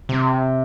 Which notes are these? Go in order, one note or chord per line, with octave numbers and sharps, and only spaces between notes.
C3